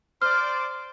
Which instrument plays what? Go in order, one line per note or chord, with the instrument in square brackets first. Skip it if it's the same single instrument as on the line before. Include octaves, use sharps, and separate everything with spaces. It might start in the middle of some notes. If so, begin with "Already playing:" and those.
[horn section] C5 D5 [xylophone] F6